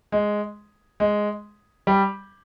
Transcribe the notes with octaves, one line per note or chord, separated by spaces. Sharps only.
G#3
G#3
G3